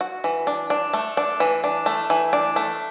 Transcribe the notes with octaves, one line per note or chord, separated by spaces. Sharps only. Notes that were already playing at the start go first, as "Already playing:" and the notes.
F#4
E3
D4
D4
A3
D4
E3
D4
A3
E3
D4
A3